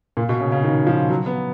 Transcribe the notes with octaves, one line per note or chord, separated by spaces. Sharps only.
A#2
B2
C#3
C#3
D#3
F3
F#3
B3